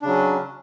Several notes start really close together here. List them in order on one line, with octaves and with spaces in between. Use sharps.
D4 C#3 F#3 C#4